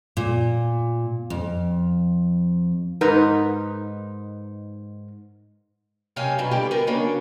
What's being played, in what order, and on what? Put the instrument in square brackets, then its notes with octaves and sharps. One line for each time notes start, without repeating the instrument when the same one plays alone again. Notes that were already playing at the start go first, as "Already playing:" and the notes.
[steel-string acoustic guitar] A#2
F2
[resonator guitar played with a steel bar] G#2 D#4 A#4 B4
[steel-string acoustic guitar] F#2 C3 G4 C#5 F5 G#5
B2 F#3 G3 E4
D3 E3 G3 G4 D5
B3 F#4 A#4
C#3 F#3 A#3 D4 C#5